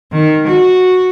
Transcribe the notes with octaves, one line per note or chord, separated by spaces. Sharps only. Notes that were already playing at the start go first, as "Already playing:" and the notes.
D#3
F#4